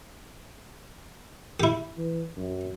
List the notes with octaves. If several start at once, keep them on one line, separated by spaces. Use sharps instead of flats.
E4 G4
E3
F#2